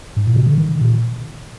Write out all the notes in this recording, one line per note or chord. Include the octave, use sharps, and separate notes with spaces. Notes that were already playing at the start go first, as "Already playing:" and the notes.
G#2
A#2
C3
D3
D#3
A#2